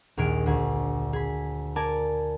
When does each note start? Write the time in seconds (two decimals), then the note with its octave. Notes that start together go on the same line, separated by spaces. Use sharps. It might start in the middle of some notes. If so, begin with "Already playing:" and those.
0.17 A#1 D#2 G#4 F6 D7
0.46 D2 G#4
1.13 G#4 B5
1.76 A#4 D5 G#5 A5